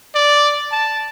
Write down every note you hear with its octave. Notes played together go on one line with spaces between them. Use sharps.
D5
A5